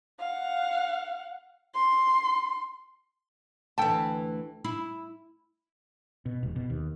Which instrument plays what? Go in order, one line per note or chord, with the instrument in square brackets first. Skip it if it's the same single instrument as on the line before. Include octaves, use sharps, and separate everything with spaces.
[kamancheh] F5 F#5
C6
[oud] D2 E3 [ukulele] A4 G5 A5
[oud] E4
[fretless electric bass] B2
E1
B2
D#2